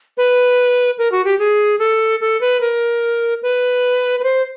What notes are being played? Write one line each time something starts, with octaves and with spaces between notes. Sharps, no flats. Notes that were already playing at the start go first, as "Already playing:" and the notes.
B4
A#4
F#4
G4
G#4
A4
A4
B4
A#4
B4
B4
C5